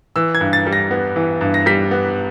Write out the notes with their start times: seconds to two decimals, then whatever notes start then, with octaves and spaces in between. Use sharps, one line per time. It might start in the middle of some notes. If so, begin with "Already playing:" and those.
0.16 E3 E6
0.35 G#6
0.41 G2
0.53 A6
0.66 G3
0.73 A#6
0.91 B3
1.16 E3
1.41 G2
1.54 A#6
1.66 G3 B6
1.91 B3